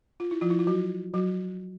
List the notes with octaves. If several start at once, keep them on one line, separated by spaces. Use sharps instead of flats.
F4
E4
F3 F4
E4
F4
F#3 F#4
F#3 F#4